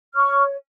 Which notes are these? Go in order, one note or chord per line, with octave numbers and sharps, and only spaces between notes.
C#5 C#6 F6